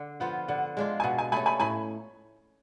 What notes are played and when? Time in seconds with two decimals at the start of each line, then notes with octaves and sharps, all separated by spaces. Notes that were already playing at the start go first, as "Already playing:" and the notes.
Already playing: D3
0.20 F3 B3 F4 F#5
0.48 D3 F#5
0.77 G#3 D4 F4
1.00 G#5
1.03 B2 F#5
1.18 G#5
1.32 A3 G#5 B5
1.36 C#4
1.46 G#5 B5
1.60 A2 G#5 B5